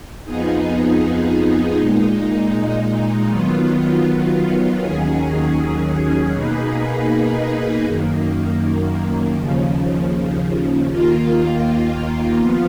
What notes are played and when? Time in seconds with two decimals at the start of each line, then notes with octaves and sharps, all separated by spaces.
0.25 F2 F3 B3 D#4 G#4
1.76 A#2 G#3 D#4
3.28 D#3 F#3 B3 F4
4.80 D#2 D#3 F#3 C#4 G#4
6.32 B2 A#3 D#4 G#4 B4
7.83 F#2 D#3 A#3
9.35 D#2 C#3 F3
10.86 D#2 D#3 A#3 F4
12.37 F3 B3 F4